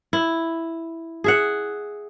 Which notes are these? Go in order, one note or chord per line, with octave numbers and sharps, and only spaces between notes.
E4
G#4 E5 F#5